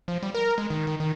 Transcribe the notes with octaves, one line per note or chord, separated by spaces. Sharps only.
F3
G3
A#4
G#3
D#3
D#3
D#3